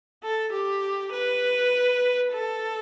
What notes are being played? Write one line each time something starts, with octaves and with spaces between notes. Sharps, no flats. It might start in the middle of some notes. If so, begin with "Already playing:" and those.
A4
G4
B4
A4